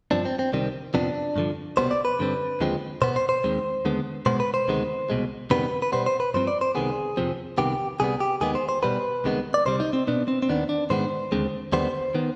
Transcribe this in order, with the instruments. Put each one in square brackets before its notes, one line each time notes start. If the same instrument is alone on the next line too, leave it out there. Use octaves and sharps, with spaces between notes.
[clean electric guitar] G2 F3 C4 D4
C4
C4
C2 C3 D#3 G3 C4
F2 C3 F3 B3 D4
G2 D3 F3
C2 B2 G3 B3 C5
D5
B4
G2 D3 G3 C4
D#2 D3 F3 G#3 C4
B2 B3 C5
C5
C5
D#2 D#3 G#3 C4
D#2 D3 G#3 B3
B2 G#3 B3 C5
B4
C5
D2 C3 D#3 G#3 B3
C2 B2 G#3
F2 C3 D#3 G3 B3 B4
B4
B2 G3 B3 C5
C5
B4
G2 F3 C4 C5
D5
C5
C2 C3 D#3 B3 G#4
F2 C3 F3 C4
C2 C3 D#3 B3 G4
C2 C3 G3 B3 G#4
G4
D#2 D#3 G#3 B3 G#4
C5
C5
B2 G3 B3 B4
C2 C3 D#3 G#3 B3
D5
C2 C3 G3 C5
D#4
C4
B2 B3 D4
C4
C4
D#2 D#3 B3 D4
D4
G#2 D#3 G#3 B3 C5
D#2 D3 G#3 C4
D#2 D3 G3 B3 C5
D#3 B3